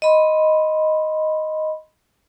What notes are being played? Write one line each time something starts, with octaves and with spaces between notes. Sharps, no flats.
D#5 B5 C6